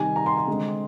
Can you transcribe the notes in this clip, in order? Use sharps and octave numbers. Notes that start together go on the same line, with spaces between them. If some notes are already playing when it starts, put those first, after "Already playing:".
Already playing: C3 D#3 G3 G#5
A#5
C6
C6
D3 G#3 C4